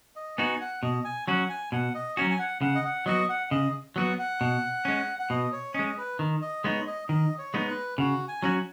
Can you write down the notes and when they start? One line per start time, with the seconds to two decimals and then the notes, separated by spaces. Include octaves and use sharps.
0.16 D#5
0.38 B3 D#4 F#4 G#5
0.61 F#5
0.83 B2 D#5
1.05 G#5
1.28 F#3 C#4 F#4 F#5
1.49 G#5
1.72 B2 F#5
1.94 D#5
2.17 F#3 C#4 F#4 G#5
2.30 G#5
2.39 F#5
2.61 C#3 F#5
2.75 D#5
2.85 F#5
3.06 F#3 B3 F#4 D#5
3.29 F#5
3.51 C#3 D#5
3.96 F#3 B3 F#4 F#5
4.18 F#5
4.41 B2
4.85 G#3 C#4
5.19 F#5
5.30 B2 D#5
5.52 C#5
5.74 G#3 C#4 D#5
5.97 B4
6.19 D#3
6.42 D#5
6.64 G#3 B3 D#4 C#5
6.87 D#5
7.08 D#3 D#5
7.38 C#5
7.54 G#3 B3 D#4
7.68 B4
7.98 C#3 F#4
8.28 G#5
8.43 F#3 C#4 F#4